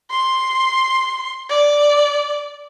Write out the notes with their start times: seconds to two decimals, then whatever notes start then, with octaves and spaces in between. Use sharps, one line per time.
0.11 C6
1.50 D5